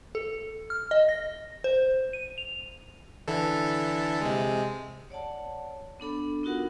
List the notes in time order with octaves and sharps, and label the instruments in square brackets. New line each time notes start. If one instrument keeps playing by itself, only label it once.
[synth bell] A4
F6
D#5
A#6
C5
D#7
F7
[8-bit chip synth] D3 E3 A4
C3 G#3
[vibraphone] C#5 D5 F#5 A5
B3 D4 A4 B5
B3 D#4 F4 F#4 A#4 F#5